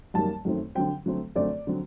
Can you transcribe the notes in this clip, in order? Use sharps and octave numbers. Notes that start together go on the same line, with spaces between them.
F#2 D#3 G3 A#3 A5
F#2 D#3 A3 C4
D3 F#3 C4 G5
D3 F#3 A3 C4
F#2 D3 A3 C4 D5
D3 F#3 C4